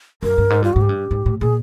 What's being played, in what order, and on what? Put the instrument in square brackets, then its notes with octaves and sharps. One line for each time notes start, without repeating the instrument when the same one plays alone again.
[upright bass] F#2 [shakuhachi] A#4
[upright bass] G2
G#2
[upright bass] G2 [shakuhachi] F4
[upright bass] G#2 [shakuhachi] F#4
[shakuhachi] G4
[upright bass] G2
G#2
A2
[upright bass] A#2 [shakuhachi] G#4